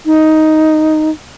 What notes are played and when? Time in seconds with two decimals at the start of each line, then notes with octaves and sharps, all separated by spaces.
0.06 D#4